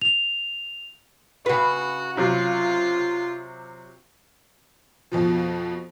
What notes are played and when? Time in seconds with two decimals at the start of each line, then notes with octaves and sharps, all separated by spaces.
0.02 F7
1.46 C#3 F#4 B4
2.17 C3 F#3 F4
5.12 F2 B2 F3